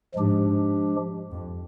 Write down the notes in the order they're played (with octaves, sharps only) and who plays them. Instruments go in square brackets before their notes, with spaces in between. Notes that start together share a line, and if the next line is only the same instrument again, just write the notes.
[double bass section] G#2 [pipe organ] F3 G#3 D4 G4
[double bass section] F2